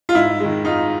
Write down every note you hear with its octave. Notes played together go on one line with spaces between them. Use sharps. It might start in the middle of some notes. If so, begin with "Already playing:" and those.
F4
G#2 E4
D#3 G#3
G#2 D#4 F4